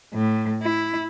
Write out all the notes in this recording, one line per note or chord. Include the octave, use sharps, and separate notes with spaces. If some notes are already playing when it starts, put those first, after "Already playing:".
A2
E4